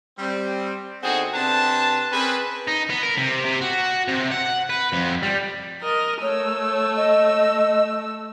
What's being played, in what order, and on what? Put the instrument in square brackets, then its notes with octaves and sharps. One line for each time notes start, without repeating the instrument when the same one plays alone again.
[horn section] G3 C4
D3 B3 C4 D#4 F#4 G#4
C3 D4 B4 A5
C4 C#4 G#4 A#4 B4
[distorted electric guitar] D#4
B3
A#4
C3
C3
F#4
C3
F#5
B4
F2
G3
[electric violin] A#4 D#5
[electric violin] A3 E6 [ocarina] C#5
[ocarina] D#5